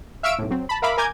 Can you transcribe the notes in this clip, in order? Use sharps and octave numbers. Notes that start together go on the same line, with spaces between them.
E5 F5 C#6 E6 D7
B1 A2
F#3 C4
A5 B5
A#4 E5 F5 B5 D6
A#4 G#5 A#5 D6 G6 G#6